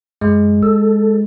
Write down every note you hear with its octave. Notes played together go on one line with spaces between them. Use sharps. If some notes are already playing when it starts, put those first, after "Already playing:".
F#2 G#3
A4